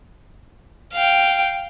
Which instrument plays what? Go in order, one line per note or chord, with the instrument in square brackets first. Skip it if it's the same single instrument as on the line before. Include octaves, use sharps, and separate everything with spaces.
[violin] F5 G5